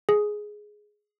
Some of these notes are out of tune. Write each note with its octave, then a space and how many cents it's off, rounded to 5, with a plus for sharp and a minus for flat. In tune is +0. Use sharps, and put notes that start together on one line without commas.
G#4 +10